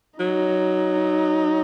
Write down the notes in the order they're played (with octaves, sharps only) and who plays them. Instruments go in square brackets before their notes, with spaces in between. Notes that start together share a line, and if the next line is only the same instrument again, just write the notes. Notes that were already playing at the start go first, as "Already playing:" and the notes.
[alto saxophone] F#3 [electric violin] D#4